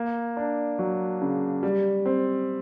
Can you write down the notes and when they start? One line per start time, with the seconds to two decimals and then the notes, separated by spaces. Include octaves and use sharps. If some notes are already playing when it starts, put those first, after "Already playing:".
Already playing: A#3
0.37 D4
0.79 F#3
1.21 C#3
1.63 G3
2.06 C4